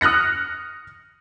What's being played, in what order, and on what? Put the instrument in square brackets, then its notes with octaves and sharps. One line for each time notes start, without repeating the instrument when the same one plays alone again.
[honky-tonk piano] D#6 F6 F#6 A#6 C#7